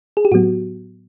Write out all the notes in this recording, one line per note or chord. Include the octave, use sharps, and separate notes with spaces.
G#4
G4
A2 F#3 B3 F#4